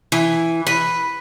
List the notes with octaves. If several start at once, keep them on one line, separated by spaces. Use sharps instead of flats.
E3
B4